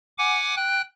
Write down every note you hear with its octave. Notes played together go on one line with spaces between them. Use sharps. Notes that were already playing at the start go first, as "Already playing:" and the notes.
F#5 G#5 D6
G5 F#6